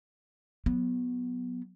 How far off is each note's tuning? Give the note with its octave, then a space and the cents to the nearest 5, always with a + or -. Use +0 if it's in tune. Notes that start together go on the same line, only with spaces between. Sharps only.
F#3 -20 B3 +0